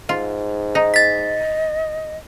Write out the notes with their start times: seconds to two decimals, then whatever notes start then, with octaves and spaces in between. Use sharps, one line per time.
0.09 G#2 F4
0.75 D#4
0.94 D#5 A6 B6